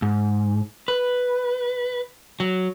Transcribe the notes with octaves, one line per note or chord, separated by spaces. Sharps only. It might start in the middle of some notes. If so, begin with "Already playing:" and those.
G#2
B4
F#3